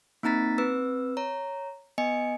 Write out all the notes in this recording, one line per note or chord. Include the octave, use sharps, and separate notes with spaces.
A#3 C4 D#4 A#5 A6 B6
C4 B4 E6
C#5 A#5
B3 D#5 G#5 C#7